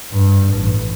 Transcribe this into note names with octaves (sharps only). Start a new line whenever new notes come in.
G2
A1